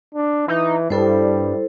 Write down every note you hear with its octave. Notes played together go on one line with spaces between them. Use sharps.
D4
E3 D#4
G2 G3 E4 A4 C5